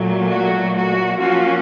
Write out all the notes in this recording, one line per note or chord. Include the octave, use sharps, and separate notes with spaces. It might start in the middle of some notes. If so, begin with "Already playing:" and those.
Already playing: A#2 F#3 A3
F#4
F#4
F3 A#3 C#4 F4 F#4